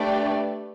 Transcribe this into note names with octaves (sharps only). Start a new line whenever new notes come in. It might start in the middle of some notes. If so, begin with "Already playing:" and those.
Already playing: A3 D4 G4 B4 D5